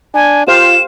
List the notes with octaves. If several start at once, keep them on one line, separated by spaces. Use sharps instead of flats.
D4 G#5
F4 G4 C5 F5 E7